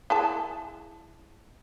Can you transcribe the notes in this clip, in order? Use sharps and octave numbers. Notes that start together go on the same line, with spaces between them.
E4 G#4 A5